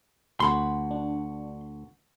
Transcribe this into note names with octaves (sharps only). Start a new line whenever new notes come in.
D2 F#4 A4 B5 C6
D4